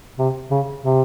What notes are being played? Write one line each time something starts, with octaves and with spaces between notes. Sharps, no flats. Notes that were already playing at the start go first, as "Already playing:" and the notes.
C3
C#3
C3